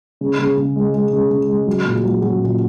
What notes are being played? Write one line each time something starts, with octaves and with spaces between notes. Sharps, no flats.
C#3
C#3
C#3
G#3
G#3
C#3
C#3
G#3
F#3
A#2
F#3
F#3
A#2